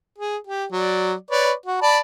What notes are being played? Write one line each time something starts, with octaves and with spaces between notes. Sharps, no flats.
G#4
G4
F#3 D5
B4 C#5 D5
F#4
D5 A5 B5